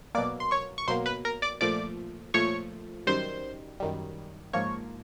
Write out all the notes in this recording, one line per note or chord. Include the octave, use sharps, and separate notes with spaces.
B2 F#3 A#3 D5 D6
C6
C#5 C#6
C#6
B2 F#3 A#3 C5 C6
B4 B5
A#4 A#5
D5 D6
A#2 F3 A3 D5 D6
A#2 F3 A3 C#5 C#6
F#2 D#3 G3 C5 C6
F#2 D#3 G3
G#2 F3 A#3 C#5 C#6